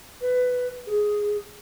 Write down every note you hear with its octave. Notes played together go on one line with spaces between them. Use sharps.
B4
G#4